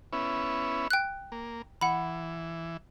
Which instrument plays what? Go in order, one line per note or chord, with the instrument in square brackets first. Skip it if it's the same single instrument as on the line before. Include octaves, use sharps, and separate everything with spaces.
[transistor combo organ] B3 C#4 E4
[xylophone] G5 F#6
[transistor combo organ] A#3
[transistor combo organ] E3 [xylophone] F#5 B5